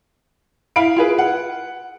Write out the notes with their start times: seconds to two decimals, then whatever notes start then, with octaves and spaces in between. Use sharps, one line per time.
0.76 E4 F5 B5 D7
0.97 F4 G#4 B4
1.18 F#5